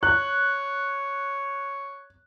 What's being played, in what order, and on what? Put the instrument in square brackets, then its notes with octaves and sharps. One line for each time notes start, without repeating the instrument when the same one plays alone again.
[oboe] C#5 [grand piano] F#6